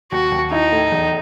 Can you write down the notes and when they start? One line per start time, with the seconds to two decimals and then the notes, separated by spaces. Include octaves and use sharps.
0.12 D#2 F#4
0.32 D#2
0.51 D#4 E4
0.71 A2
0.92 E2